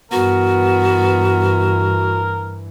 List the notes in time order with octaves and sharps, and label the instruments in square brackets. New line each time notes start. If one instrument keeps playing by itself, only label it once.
[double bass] G2 E3 [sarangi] B3 [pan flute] F#4 [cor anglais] A#4